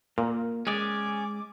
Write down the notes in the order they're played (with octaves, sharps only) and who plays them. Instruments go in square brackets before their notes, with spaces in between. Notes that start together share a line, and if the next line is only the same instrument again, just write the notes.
[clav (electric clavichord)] A#2 [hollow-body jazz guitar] A#3
[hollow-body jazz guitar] G#3 [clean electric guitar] C#4 G#4 D5 [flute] D6